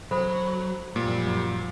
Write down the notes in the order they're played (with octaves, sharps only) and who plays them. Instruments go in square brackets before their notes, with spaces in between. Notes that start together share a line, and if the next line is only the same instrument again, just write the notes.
[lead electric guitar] F#3 [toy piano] A4 C5 B5
[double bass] F#2 F3 [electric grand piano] A#2 [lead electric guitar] G3